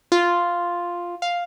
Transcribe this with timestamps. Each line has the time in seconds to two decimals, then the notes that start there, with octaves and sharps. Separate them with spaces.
0.12 F4
1.22 F5